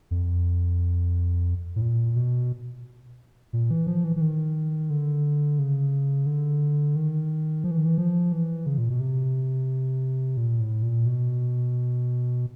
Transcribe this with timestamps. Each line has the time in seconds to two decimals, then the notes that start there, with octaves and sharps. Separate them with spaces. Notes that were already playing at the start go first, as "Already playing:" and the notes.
0.11 F2
1.76 A2
1.82 A#2
2.16 B2
3.53 A#2
3.71 E3
3.87 F3
4.04 E3
4.16 E3
4.21 D#3
4.90 D3
5.59 C#3
6.26 D3
6.96 D#3
7.64 F3
7.71 E3
7.78 D#3
7.86 E3
7.98 F3
8.32 E3
8.66 C#3
8.78 A#2
8.90 B2
9.00 C3
10.37 A#2
10.60 A2
10.83 A#2
11.06 B2